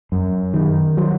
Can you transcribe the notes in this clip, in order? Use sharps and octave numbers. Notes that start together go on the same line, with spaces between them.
F#2
D#3
F#3